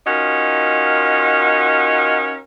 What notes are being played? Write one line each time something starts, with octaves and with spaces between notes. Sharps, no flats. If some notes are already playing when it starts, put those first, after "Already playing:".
C#4 D#4 F4 F#4 A#4